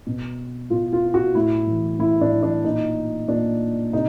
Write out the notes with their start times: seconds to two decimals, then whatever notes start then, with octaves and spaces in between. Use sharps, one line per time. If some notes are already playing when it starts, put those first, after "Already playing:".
0.07 B2
0.70 B2 F4
0.93 F4
1.14 F#4
1.35 A2 E4
1.67 E3
1.99 A2 E4
2.21 D4
2.32 E3
2.43 D4
2.64 A#2 D#4
3.28 A#2 D4
3.93 C3 D#4